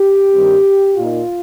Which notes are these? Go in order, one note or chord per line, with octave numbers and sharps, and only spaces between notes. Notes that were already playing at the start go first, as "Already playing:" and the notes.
Already playing: G4
G2 D#3 G3 C4
A#2 A#3 D#4 F4